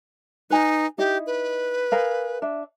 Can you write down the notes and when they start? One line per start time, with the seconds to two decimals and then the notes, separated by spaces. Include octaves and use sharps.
0.50 D#4 B4 G#5 A#5
0.98 D#4 E4 G4 D#5
1.27 B4
1.92 G#4 A#4 F5
2.42 D4 E5